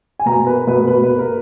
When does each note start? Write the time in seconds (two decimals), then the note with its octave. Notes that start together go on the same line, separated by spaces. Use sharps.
0.19 G#5
0.26 B2 A#5
0.47 A#3 B4
0.67 B2 B4
0.87 B2 B4
1.04 B4
1.09 A#3
1.19 A#4